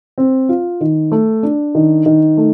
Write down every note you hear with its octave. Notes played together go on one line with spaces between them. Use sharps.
C4
F4
D#3
A3
D4
D#3
D#3
A3